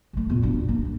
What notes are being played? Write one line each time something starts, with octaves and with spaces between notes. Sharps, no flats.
D3 A3
E2 A#2
F#2 D4
A#3
G2